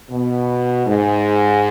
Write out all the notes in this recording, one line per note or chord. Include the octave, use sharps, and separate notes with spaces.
B2
G#2